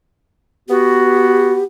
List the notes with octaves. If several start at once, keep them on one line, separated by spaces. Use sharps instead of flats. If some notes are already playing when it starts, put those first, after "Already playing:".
B3 F#4 G4